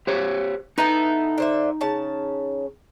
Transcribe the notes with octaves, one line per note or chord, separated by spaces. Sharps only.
G4 C5 C#5
B3 D#4 E4 A4 A#5
D3 C5 E5
C#3 C#4 A5